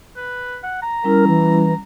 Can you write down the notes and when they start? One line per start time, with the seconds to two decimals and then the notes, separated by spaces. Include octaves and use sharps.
0.17 B4
0.63 F#5
0.82 A#5
1.04 G3 C#4 E4 A#4
1.28 E3